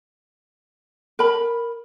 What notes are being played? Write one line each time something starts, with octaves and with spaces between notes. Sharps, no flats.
A#4 B5